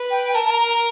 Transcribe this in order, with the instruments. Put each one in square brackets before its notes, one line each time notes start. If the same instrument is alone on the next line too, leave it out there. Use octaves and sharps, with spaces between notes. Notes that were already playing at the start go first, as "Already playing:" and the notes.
Already playing: [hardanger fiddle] B4
[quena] G5
[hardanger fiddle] A#4 [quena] A5
[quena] A5
A#5
A#5